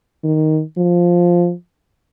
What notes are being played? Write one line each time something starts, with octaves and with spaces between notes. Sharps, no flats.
D#3
F3